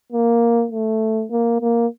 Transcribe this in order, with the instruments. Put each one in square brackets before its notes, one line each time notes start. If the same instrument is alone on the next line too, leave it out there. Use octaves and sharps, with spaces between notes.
[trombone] A#3
A3
A#3
A#3